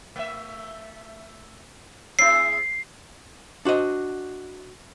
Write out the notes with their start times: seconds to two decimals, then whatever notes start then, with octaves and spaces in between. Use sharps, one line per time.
0.16 A3 E5
2.19 B3 E4 G#4 C7
3.65 D4 F#4 C5 D#5